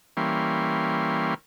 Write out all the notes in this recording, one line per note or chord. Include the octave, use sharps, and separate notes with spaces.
E3 G3 A#3 C#4 C6